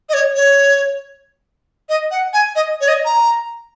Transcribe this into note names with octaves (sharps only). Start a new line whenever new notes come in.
D#5
C#5
C#5
D#5
F#5
G#5
D#5
C#5
D#5
A#5